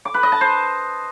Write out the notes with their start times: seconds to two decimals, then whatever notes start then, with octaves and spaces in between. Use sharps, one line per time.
0.05 D6
0.14 B4
0.23 D#5
0.32 A5
0.41 C5